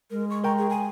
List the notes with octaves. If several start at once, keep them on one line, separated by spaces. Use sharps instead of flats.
G#3 A#4
C#6
A#4 G5 A#5 C#6
G#4
G#5